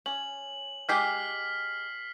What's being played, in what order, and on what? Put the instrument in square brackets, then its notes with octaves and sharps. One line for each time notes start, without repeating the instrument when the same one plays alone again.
[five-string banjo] C#4 [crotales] F#7
[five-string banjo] G#3 G4 G#5 [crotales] F6 B6 C7